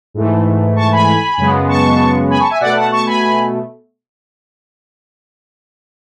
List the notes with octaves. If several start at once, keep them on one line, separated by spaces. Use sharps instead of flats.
G#2 E3 A3
A5 C#6
G#5 B5
F#2 C#3 G#3 B3
A5 C#6
G#5 B5
A5 C#6
E5 G#5
B2 A3 D5 F#5
F#5 A5
A5 C#6
G#5 B5